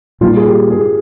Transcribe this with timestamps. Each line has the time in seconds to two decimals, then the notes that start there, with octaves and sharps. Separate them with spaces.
0.21 A#2 G3 A#3 F4
0.37 G#4
0.46 G4
0.70 G#4